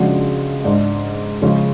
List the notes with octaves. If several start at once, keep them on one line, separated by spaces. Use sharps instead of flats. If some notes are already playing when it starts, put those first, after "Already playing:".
Already playing: C#3 F3 G#3 D4 F#4
G#2 G#3 D4
C#3 F3 G#3 C#4